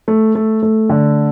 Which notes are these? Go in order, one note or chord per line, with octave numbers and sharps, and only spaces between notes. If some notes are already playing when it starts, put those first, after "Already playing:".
A3
A3
A3
D3